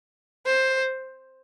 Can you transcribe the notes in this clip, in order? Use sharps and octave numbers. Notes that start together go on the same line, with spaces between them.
C5